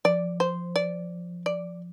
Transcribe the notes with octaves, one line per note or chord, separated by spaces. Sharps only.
F3 D5
C5
D5
D5